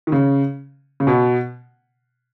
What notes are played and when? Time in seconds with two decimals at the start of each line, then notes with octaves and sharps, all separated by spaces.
0.07 D#3
0.12 C#3
1.00 C#3
1.07 B2